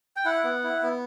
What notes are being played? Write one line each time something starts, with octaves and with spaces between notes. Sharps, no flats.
G5
E4 F#5
B3
E4
B3